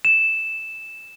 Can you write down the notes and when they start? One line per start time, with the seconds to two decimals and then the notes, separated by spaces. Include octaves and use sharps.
0.05 E7